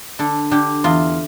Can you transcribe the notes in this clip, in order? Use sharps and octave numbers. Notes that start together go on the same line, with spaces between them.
D3 A4
D3 G4
E2 F4